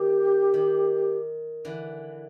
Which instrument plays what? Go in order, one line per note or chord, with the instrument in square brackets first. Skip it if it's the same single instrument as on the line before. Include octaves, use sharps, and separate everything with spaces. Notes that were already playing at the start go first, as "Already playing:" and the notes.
Already playing: [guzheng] D#3 [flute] G4
[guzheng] D#3
D3 E3